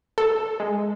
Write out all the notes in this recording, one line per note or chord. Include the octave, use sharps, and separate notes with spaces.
A4
G#3